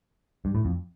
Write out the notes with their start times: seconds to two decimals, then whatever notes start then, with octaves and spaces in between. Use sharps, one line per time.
0.45 G2
0.55 A2
0.65 F2